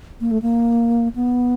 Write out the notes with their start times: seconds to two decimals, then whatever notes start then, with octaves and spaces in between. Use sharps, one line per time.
0.21 A#3
0.31 A3
0.42 A#3
1.16 B3